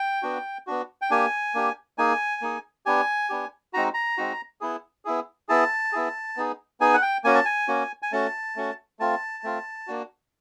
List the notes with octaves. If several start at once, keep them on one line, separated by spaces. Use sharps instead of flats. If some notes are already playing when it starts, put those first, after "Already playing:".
Already playing: G5
B3 D4 F#4
B3 D4 F#4
G5
A#3 D4 G4 G#5
A#3 D4 G4
A#3 D#4 G#4 G#5
A#3 D#4 G#4
B3 D4 G4 G#5
B3 D4 G4
G#3 C4 D#4 F#4 A#5
A#5
G#3 C4 D#4 F#4
B3 E4 G#4
B3 E4 G#4
B3 E4 G#4 A5
B3 E4 G#4
B3 D#4 G#4
B3 D#4 G#4 G#5
F#5
G5
A#3 C#4 F#4 G#5
A5
G#5
A#3 C#4 F#4
G#5
A3 C#4 F#4 A5
A3 C#4 F#4
A3 C4 F4 A5
A3 C4 F4
A#3 D4 F#4